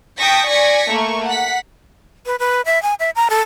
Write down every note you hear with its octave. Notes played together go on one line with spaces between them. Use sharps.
G5 A5 C#6 D#6 A#6 B6
D5 G#5 A#6 B6 C#7
A3 A#3 C#6
F#5 B6
B4
B4
E5
G#5
E5
A#5
A4